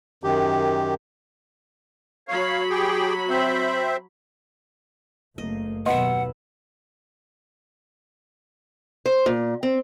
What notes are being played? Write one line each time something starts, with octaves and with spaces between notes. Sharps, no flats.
F#2 D#3 G4
F#3 C#5 F5 B5
G4 G#4 G5
C4 C5 E5
F#1 A3 A#3 D#5
D#2 B2 F#3 B3 D#5 E5 F#5 C6
C5
A#2
C4